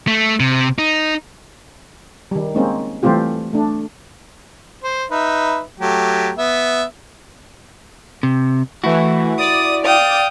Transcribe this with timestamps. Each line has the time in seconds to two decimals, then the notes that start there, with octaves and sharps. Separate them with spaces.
0.07 A3
0.40 C3
0.78 D#4
2.31 D#3 G3
2.55 G#3 A#3 C4 C#4 D#4
3.03 E3 G3 A3 C4 F4 G4
3.53 A3 D4
4.84 C5
5.11 D#4 B4 E5
5.80 F#3 A3 G4
6.38 B3 E5
8.23 C3
8.84 E3 A3 E4 F#4
9.38 D5 D#6
9.85 F5 G5 D#6